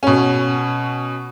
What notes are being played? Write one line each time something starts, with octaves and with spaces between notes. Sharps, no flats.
B2 C#4